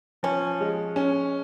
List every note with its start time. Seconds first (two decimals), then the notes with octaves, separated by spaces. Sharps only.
0.23 F3 C#4
0.61 G#3
0.96 C#4